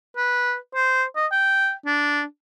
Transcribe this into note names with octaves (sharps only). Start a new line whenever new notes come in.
B4
C5
D#5
G5
D4